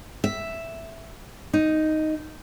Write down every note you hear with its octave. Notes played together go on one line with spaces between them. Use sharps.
E5
D#4